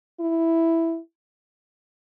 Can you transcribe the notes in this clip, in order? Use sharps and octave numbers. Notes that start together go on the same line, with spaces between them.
E4